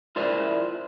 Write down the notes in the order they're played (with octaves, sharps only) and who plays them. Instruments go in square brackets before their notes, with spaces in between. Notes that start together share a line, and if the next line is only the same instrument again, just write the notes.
[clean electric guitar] E4 F4 A#4 C5 D5 E5